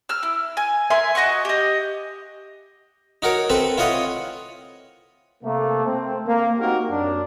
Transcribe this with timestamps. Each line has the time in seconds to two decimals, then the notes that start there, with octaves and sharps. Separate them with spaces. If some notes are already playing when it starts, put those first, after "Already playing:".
0.09 E6 F6
0.23 E4
0.57 G#5
0.90 A#4 E5 G#5 C6
1.15 F#4 D#5 F#5 C#6
1.45 G4 D#5
3.22 D#4 F#4 A#4 C#5
3.50 C4 A4 B4
3.78 E4 F4 C#5 D#5 F#5
5.43 C3 A3 A#3
5.84 A3 C4
6.27 A#3
6.59 A#3 C4 D#4 F#4 G4 A#4
6.89 F#2 D4